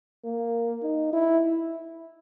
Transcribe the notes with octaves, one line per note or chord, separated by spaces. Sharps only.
A#3
D#4
E4